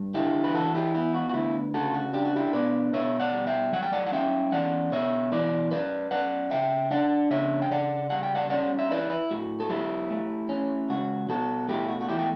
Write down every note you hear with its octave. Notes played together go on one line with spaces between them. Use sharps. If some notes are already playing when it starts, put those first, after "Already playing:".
Already playing: G2
D3 E4 G4
B4
E3 F#4 A4
E4 G4
B3 E4
F#4
F#4
D2 E4
C#3 F#4 A4
F#4
D4 G4
F#4
E4 G4
B2 B4 D5
B2 C#5 E5
D5 F#5
G3
E5 G5
F#3 F#5
G5
D5 F#5
F#5
C#4 E5 G5
E2 D5 F#5
B2 C#5 E5
E3 B4 D5
F#2 B4 D5
F#2 D5 F#5
C#3 E5 G5
D4 D5 F#5
C#3 C#5 E5
G5
C#3 D5 F#5
G3 F#5
G5
D5 F#5
C#4 D5 F#5
E5
E4 B4 D5
E4
A2 F#4
A4
F#3 E4 G4
A3
C#4
C#2 F#4
B2 F#4 A4
A3 E4 G4
F#4
F#4
E2 E4 G4
G5